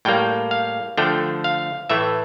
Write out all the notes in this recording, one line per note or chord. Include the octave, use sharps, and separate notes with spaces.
A2 G3 A#3 G5
F5
D3 F3 A3 G5
F5
A2 E3 A3 E5